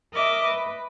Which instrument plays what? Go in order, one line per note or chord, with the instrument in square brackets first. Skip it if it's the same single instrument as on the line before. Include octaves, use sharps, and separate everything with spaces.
[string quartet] A#4 D#5 E5 D6
B4